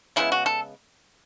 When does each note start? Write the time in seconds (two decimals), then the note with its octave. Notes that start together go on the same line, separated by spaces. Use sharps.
0.16 C#3 E3 G#3 B3 E4
0.32 F#4
0.46 A4